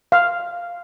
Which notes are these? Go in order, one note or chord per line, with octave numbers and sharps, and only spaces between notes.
F5